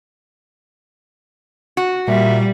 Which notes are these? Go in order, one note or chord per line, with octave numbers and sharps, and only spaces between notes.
F#4
A#2 G3 E5